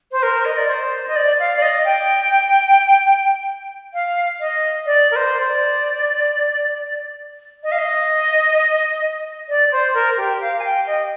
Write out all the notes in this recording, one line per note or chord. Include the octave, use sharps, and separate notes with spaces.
C5
A#4
D#5
D5
C5
D#5
D5
F5
D5
D#5
G5
F5
D#5
D5
A#4
C5
D5
D#5
F5
D#5
D5
C5
A#4
G4
F5
G#5
G5
D#5